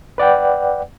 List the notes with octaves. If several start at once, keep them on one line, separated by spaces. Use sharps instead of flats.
B4 D5 F#5 G5